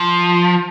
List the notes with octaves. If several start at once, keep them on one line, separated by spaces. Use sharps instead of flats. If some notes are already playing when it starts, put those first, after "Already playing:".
Already playing: F3